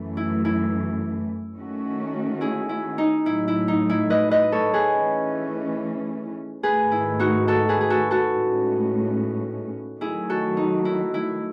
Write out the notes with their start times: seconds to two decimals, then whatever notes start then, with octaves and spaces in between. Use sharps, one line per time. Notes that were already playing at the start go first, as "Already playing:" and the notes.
Already playing: F#2 E3 A3
0.17 E4
0.45 E4
1.57 D#3 A3 C#4 F#4
2.41 E4 G#4
2.69 E4
2.98 D#4
3.26 A2 F#3 A3 E4
3.48 E4
3.68 D#4
3.90 E4
4.10 B4 D#5
4.31 B4 D#5
4.52 A4 C#5
4.74 G#4 B4
4.95 E3 A3 C#4
6.63 G#2 D#3 A3 G#4 B4
6.92 E4
7.19 D#4 F#4
7.48 F#4 A4
7.69 G#4 B4
7.81 G#4
7.90 F#4 A4
8.11 F#4 A4
8.33 A2 G#3 C#4
10.01 D#3 F#3 A3 E4 G#4
10.29 F#4 A4
10.57 D#4
10.85 E4
11.14 E4